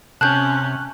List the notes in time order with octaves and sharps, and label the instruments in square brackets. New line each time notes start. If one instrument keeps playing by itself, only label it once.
[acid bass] C3 [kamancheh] C#4 [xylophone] A5 G6 [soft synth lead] F#6